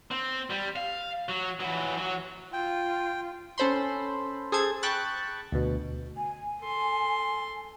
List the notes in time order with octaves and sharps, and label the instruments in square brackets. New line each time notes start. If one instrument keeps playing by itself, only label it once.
[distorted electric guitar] C4
G3
F5
F#3
E3 F#3
F#3
[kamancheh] F4 [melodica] G5
[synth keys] C#4 A4 C5 B5 C6
G#4 A4 C5 A5 G#6
G5 A5 B5 C#6 F#6 A6
D2 B2
[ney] G#5
[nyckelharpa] A4 C6